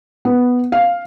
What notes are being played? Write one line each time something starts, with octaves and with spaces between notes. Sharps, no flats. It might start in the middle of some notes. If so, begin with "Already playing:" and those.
B3
F5